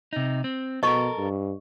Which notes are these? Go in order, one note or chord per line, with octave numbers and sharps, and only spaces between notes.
C3 D#4
C4
B2 A4 A#4 D#5 C#6
G2